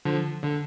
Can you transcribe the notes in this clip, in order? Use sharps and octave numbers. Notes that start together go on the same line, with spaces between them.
D3 F3
D3